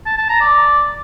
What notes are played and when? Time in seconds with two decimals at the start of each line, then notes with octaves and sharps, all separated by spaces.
0.06 A5
0.17 A5
0.29 A#5
0.40 D5